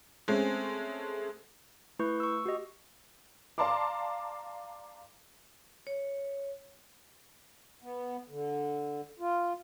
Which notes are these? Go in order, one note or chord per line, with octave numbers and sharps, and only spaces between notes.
G#3 A3 C4 C#4
A3 E4 B4 C#6 G6
C#6 E6
F#4 G4 D#5
D5 F5 A5 A#5 C6 D6
C#5
B3
D3
F4